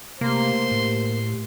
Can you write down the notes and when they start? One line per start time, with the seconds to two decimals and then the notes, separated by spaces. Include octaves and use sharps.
0.21 C3 A3 A#3 G4 C5 C6
0.71 A2